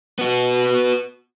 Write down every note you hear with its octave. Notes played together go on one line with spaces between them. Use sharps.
B3 F#4